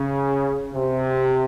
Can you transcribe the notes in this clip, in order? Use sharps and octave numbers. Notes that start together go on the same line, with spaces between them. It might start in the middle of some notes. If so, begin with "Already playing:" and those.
Already playing: C#3
C3